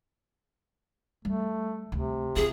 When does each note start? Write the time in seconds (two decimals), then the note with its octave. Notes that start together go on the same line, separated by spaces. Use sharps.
1.25 G3 A3
1.92 D2 C3
2.36 C4 F4 G#4